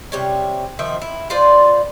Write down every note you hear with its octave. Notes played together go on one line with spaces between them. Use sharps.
C3 G3 C#5
D#3 F3 E5
E4
F4 B4 C5 D5